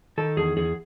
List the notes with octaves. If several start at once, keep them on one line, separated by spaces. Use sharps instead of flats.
D#3 A4
E2 G#4
E2 G#4